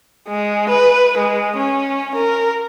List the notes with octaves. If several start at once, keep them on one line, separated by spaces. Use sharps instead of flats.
G#3
B4
G#3
C#4
A#4